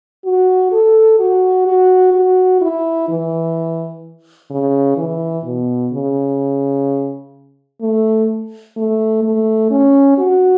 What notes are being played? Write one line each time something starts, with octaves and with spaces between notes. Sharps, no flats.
F#4
A4
F#4
F#4
F#4
E4
E3
C#3
E3
B2
C#3
A3
A3
A3
C#4
F#4